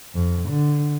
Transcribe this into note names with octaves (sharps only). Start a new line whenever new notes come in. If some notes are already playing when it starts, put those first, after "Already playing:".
F2
D3